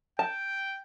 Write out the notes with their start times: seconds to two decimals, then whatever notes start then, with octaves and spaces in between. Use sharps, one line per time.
0.19 G5 A5